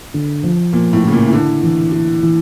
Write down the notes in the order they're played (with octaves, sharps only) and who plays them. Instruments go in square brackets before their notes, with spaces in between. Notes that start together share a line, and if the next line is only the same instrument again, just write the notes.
[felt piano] D3
F3
[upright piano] A#2 [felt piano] F3
[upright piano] A2
[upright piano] C#3 [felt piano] E4
[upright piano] A#2
E3
[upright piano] D3 [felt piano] E4
[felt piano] E3
E4
E3